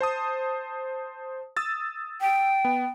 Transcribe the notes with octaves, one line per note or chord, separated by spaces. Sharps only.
C5 A5 D#6
D#6 E6 A6
G5
B3